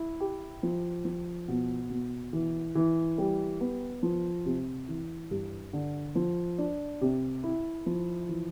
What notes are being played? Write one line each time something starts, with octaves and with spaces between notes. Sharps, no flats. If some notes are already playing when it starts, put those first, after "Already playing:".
Already playing: E4
G4
F3
F3
B2
B2
E3
E3
G3
B3
F3
C3
E3
G2
D3
F3
D4
C3
E4
F3
E3